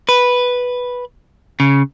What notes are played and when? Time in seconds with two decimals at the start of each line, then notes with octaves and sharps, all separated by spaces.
0.09 B4
1.60 C#3